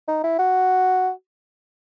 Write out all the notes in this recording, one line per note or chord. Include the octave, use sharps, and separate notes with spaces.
D#4
E4
F#4